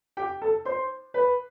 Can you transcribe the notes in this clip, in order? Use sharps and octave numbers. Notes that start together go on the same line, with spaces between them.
G4 G5
A4 A5
C5 C6
B4 B5